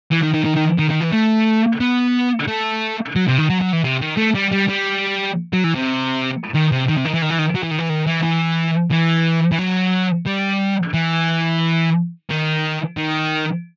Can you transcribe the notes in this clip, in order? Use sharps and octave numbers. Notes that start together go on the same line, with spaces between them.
E3
D#3
D#3
D#3
D#3
D#3
D#3
E3
A3
B3
A3
F#3
C3
D#3
F#3
F#3
E3
C3
D#3
A3
G3
G3
G3
F#3
E3
C3
D#3
C3
D#3
C3
D#3
E3
D#3
E3
D#3
F#3
E3
D#3
E3
D#3
E3
E3
E3
E3
F#3
G3
E3
D#3
D#3